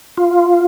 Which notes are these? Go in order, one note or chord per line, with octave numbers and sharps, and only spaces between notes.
F4